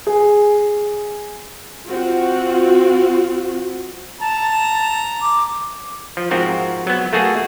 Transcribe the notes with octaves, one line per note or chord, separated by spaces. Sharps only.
G#4
C4 F4 F#4
A5 A#5
D6
F3
G#2 F3 C4 F#4 A#4
F#3 B3
A3 A#3 F#4 G#4